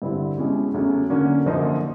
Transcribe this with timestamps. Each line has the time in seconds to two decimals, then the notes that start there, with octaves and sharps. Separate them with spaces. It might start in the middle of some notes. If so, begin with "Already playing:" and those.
0.02 G2 D3 G3 C4 E4
0.38 B2 G#3 C#4 E4 G4
0.74 E2 C#3 F#3 A3 C#4
1.10 D3 F#3 A#3 C#4
1.46 F#2 D3 F3 A#3 D#4